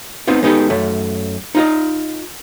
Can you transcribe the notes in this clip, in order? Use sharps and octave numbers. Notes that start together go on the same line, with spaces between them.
B3 C4 D#4 F4
G#3 B3 D#4 G4 A4
F#2 A3
D#4 F4 D#5